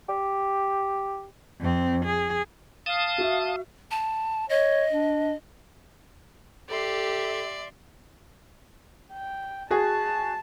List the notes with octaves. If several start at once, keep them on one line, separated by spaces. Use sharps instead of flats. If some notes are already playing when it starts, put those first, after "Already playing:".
G4
F2 C4
G#4
F5 A5 D#6
F#4 E5
A5
C#5 D#5
D4
G4 A4 D5 E5 C6
G5
F#4 G#4 A5